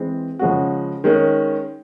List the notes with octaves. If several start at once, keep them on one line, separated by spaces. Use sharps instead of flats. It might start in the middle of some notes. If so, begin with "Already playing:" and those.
Already playing: E3 G#3 C4
C#3 F3 G#3 C#4 F#4
D#3 G#3 C#4